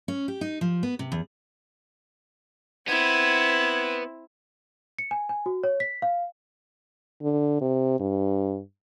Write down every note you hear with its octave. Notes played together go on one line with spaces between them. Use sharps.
C#4
G4
D#4
F3
B3
C3
E2
B3 C4 E4 G#6
C#7
G#5
G#5
F#4
C#5
B6
F5
D3
C3
G2